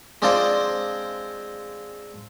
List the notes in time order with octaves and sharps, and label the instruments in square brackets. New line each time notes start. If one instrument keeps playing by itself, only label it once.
[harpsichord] G#3 C4 D4 F4 C5 D5